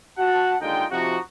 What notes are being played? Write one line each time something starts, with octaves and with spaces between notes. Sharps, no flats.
F#4 F#5 A5
D#2 D3 G#3 D#4 F4 G5
C3 F3 D#4 F#4